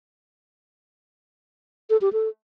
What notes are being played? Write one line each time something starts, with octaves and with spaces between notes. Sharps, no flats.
A4
G4
A4